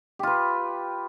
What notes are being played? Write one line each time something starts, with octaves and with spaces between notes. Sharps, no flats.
F4 G4 B4